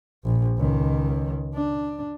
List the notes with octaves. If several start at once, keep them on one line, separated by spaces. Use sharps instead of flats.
A#1
C#2 D#3
D4